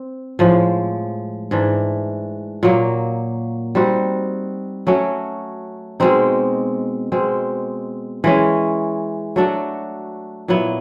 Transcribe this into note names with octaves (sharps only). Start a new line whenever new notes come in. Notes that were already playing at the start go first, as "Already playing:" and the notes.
Already playing: C4
A2 F3 G#3
G#2 E3 A3 D4
A#2 F#3 A#3
G3 C4 D#4 F#4
F#3 A3 C#4 F#4
B2 G#3 C4 D#4
B2 G#3 C4
E3 G#3 C#4
F#3 A3 D4 F#4
A#2 F#3 B3 E4